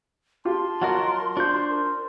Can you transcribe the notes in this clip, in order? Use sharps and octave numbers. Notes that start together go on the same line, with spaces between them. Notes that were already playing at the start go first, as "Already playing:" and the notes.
F4 G4 A5 C6
F#3 F4 F#4 A#4 D#5 C#6
D4 F4 C5 C#6 G6
A#4